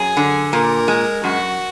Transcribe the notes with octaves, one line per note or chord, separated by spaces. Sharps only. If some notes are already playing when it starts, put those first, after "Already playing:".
Already playing: F#2 F#3 G#4
D3
A#2 A#4
G#3
F#2 F#4